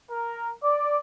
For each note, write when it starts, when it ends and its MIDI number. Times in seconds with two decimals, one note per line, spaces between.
0.10 0.50 70
0.63 0.97 74